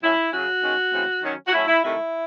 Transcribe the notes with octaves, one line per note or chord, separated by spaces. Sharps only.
A2 F#3 C#4 E4
C#3 F#3 C#4 F#4
D#3 G#3 C#4
C#3 E3 A3 C4
D#3 F#3 C#4
F#4
A2 F#3 A3 C#4 E4
E4
C3 D#3 A3 E4